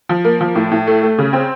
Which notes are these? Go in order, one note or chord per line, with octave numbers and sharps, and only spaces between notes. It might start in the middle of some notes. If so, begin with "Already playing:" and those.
F3
A#3
F3
A2
A2
A3
A3
C#3
C4